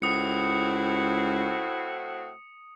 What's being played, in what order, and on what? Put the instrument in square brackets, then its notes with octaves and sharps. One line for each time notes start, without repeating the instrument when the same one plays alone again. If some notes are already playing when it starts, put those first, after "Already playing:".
[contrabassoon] C#2 [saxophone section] A2 C4 F#4 [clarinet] E4 [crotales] D#6 C#7